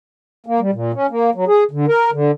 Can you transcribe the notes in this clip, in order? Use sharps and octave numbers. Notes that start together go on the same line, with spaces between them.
A#3
G3
A#2
C#4
A#3
F#3
G#4
D3
A#4
D3